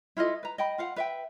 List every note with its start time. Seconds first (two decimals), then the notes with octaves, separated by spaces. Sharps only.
0.17 E4 F4 A4 D#5
0.43 B4 A#5
0.58 D#5 G5 B5
0.78 F4 F5 F#5
0.96 B4 E5 G5